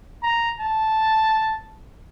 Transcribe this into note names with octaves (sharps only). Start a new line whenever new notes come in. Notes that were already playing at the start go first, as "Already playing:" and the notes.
A#5
A5